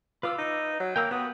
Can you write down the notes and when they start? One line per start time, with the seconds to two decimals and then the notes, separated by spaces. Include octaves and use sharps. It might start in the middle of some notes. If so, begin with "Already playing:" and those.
0.23 F4 B4 D6 E6
0.38 D#4
0.80 F#3
0.96 A#3 G5 A#5 E6
1.11 B3 F#4 G4 D#6